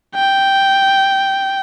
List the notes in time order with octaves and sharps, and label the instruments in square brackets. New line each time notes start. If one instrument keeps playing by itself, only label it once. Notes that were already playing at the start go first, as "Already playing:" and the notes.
[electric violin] G5